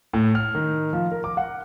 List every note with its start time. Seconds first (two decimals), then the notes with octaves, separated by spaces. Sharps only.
0.13 A2
0.35 F6
0.55 D#3
0.93 F3
1.12 A#4
1.24 D6
1.37 F#5